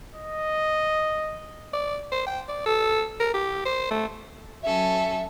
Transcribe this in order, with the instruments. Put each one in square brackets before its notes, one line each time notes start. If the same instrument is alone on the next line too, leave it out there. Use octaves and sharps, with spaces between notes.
[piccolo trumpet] D#5
[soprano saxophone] D5
C5
G5
D5
A4
A#4
G4
C5
A3
[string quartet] F#3 C#4 A4 [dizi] E5